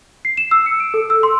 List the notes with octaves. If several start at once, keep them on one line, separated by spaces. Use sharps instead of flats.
C7
E7
E6
C#7
D7
A4
E6
C6